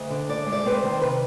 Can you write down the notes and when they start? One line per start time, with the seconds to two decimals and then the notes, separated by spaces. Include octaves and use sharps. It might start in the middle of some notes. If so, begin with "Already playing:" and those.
Already playing: D2 D#5
0.10 D3
0.29 G#2 D5
0.46 G#3
0.53 D5
0.66 C4 B4
0.78 C5
0.83 D#3
1.01 C3 B4